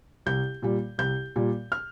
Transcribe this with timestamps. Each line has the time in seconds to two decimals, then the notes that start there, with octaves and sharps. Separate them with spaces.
0.26 C2 G6
0.62 A#2 G3
0.98 C2 G6
1.36 A#2 G3
1.72 F6